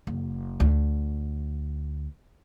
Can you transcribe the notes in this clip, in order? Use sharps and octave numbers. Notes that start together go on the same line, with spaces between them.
F#1
D2